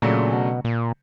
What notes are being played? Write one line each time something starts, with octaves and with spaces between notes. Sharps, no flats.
A#2 C#3 F#3 A3 D4
B2
A#2